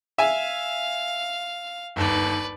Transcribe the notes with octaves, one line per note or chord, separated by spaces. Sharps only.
E5 F5 G#5
G1 D#2 B4 D5